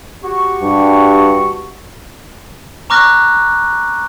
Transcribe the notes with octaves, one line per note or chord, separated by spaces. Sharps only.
F#4 G4 C#6
G2
A#5 C#6 D6 F6 F#6 A#6